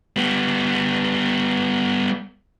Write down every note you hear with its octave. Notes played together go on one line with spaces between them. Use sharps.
G3 B3